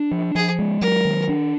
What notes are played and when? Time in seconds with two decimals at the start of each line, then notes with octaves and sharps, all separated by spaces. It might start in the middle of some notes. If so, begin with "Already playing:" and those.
Already playing: D4
0.11 F3
0.35 F3 G#4
0.59 G#3
0.81 F#3 A#4
1.05 D#3
1.29 D4